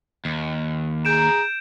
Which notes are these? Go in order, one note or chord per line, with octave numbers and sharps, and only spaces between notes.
D#2
G#4 A#5 G6 D7 E7